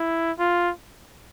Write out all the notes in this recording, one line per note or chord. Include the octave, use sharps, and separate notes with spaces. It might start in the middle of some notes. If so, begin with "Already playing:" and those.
Already playing: E4
F4